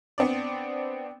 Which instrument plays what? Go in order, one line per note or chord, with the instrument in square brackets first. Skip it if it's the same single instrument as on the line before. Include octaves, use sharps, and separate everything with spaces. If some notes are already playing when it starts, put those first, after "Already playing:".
[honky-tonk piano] B3 C4 D4 D5